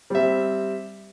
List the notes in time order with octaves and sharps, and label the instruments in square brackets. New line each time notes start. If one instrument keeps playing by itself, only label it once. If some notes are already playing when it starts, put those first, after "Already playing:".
[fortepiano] G3 C4 E5